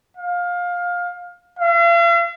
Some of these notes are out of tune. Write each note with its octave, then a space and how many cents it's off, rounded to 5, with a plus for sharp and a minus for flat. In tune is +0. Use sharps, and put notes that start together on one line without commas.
F5 +20
F5 -45